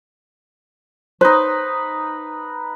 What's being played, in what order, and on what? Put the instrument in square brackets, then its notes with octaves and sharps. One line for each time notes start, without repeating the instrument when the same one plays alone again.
[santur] D#4 B4 [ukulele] C5